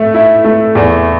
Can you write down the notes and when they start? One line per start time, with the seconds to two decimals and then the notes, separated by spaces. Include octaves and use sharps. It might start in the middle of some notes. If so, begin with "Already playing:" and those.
Already playing: A3
0.14 E4
0.44 A3
0.75 E2